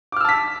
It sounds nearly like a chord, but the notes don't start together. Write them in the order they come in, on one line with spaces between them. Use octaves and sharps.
D6 F6 E6 A5 B6